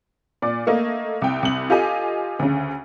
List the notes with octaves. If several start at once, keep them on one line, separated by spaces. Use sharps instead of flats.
A#2 D5
A3 A#3 D#5
C2 G5
C2 F#7
F4 G4 A4 D#5 G#5
D2 C#3